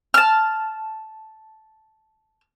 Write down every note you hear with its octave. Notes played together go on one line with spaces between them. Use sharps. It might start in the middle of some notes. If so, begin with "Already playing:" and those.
A5 F6